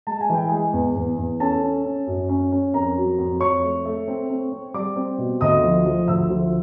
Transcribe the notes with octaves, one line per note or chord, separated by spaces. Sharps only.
G#3 A5
G#5
E3 G5
G#3 G#4 G#5
E2
E2
E2
C#4 A4 A5
C#4
C#4
F#2
C#4
C#4
F2 A#4 A#5
F#3
F2
F2 C#5 C#6
A3
A3
C4
C4
C4
G3 D5 D6
C4
B2
D2 D#5 D#6
F3
F3
D2 E5 E6
F3